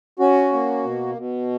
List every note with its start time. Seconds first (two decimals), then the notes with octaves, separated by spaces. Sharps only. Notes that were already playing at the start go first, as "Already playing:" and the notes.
0.19 C#4 F#4
0.53 A#3
0.85 B2
1.17 B2